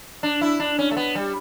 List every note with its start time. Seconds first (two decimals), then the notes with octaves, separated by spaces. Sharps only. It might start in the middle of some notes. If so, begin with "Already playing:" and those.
0.23 D4
0.41 E4
0.60 D4
0.79 C#4
0.91 A3
0.97 B3
1.15 G3